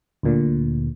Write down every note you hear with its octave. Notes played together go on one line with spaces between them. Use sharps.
D2 A#2 D3